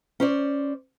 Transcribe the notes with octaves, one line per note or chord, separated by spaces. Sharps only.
C#4 C5 D5